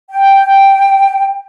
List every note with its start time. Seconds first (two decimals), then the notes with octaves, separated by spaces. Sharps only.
0.10 G5